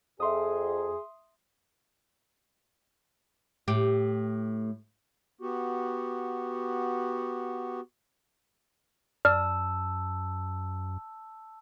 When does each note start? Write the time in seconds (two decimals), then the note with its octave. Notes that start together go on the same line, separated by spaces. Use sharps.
0.20 F2 G#4 E5 C6 D#6
3.68 A2 G4
5.41 B3 F#4 G4
9.25 F#2 D5 A5 E6 F6